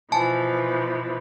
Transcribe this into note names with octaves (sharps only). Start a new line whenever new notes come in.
B2 E3 F3 G#5 A5